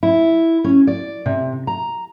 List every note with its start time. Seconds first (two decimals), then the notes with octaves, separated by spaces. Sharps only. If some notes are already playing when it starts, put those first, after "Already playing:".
0.03 E4
0.64 C#4
0.87 D5
1.26 C3
1.67 A#5